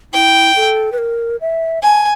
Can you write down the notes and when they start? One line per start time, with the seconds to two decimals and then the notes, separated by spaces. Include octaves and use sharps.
0.13 E4 G5
0.56 A4
0.92 B4
0.98 A#4
1.41 E5
1.83 G#5 A5